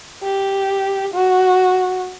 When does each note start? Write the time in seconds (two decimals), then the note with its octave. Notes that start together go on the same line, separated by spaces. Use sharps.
0.23 G4
1.14 F#4